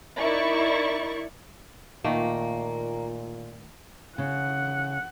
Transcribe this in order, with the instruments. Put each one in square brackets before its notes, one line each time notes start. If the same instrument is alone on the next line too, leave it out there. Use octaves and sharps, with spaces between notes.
[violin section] D#4 E4 A#4 D5 C#6
[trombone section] A#2 [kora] D#3 A3 [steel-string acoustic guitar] A#3
[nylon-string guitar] C#3 [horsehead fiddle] F#5